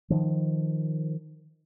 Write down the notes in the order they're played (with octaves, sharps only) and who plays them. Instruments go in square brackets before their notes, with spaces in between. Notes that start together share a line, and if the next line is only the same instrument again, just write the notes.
[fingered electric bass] D#3 F3